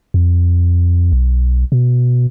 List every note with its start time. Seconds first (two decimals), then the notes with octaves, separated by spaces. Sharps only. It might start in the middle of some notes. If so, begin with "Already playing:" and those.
0.14 F2
1.12 B1
1.72 B2